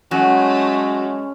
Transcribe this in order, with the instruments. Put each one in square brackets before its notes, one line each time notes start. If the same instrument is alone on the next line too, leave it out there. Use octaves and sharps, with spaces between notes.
[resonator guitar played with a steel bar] F#3 [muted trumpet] G#3 [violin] A3 [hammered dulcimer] C#4